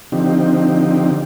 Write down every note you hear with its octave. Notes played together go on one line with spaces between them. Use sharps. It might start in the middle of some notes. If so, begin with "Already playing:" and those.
D3 F3 C4 D#4 G4